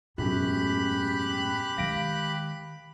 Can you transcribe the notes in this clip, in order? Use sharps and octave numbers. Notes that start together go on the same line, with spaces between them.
E1 F#2 A2 G4 B5 F#6
D#3 G#3 F5 A#6 D7